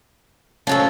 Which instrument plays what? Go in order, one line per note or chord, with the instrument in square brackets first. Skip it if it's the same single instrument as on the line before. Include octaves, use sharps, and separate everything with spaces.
[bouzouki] F3 F#3 A4 [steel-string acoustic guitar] C#4